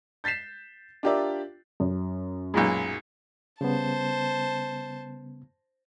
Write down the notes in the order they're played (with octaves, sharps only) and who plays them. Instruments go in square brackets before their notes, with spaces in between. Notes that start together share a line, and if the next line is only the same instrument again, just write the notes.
[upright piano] G6 A6 B6 C7 E7
D4 F4 G4 A#4 D5 E5
[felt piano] F#2
[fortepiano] B1 A#2 G#3
[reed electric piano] C#3 G3 B3 [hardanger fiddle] C5 A5